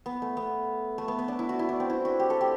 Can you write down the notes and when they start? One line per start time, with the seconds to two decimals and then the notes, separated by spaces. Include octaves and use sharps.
0.06 B3
0.22 A3
0.37 B3
0.98 A3
1.08 B3
1.19 B3
1.28 D4
1.39 E4
1.49 F#4
1.59 E4
1.69 D4
1.80 C4
1.90 E4
2.05 F#4
2.20 G4
2.30 A4
2.41 G4